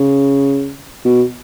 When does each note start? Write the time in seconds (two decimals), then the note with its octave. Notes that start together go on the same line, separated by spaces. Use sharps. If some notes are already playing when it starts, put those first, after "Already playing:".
Already playing: C#3
1.05 B2